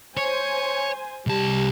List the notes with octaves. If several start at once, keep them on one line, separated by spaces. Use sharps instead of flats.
C5 C#5 G#5
C2 G3 A5